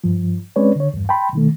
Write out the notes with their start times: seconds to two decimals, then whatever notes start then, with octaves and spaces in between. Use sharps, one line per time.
0.04 G2 F3
0.56 G#3 C4 C#4 B4 C#5 D5
0.76 D3 C#5
0.94 E2 G2
1.09 G5 A5 B5 C6
1.33 B2 D#3 A3